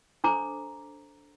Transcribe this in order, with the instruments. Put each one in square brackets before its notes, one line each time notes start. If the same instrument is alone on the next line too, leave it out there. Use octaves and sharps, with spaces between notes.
[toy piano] D4 A4 C5 A#5 D6